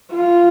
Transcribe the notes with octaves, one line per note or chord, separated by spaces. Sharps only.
F4